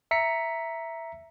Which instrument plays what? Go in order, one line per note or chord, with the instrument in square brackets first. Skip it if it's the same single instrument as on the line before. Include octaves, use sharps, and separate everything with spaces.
[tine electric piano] E5 A#5 B6 C#7